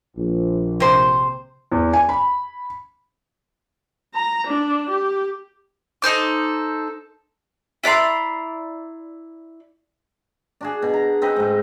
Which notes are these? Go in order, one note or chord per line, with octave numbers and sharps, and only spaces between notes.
A#1
C3 C5
E2
G#5
B5
A#5
D4
G4
D#4 A4 C5 D6
E4 D5 A#5 C6
D4 F#4 G#4
B2
A#5
C4 D#4 B4 D#5
G#2 A3